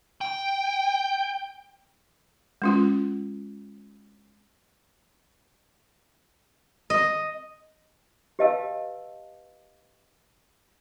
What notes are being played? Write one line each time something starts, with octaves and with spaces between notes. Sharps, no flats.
G5
G#3 C#4 F4
D#5
G4 B4 D#5 F5 A5 E6